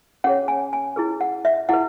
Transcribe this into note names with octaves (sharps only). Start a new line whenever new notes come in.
C#4 G#4 C#5 F#5
G#5
G#5
E4 G#4 B4
F#5
E5
E4 G#4 B4 F#5